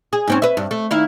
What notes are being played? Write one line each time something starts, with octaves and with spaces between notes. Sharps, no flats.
G#4
G#2 C4 C#4
B4 E5
G2
A3
D#3 E4 F5